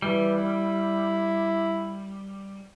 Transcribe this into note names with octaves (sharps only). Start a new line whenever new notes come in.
E3 G3
E4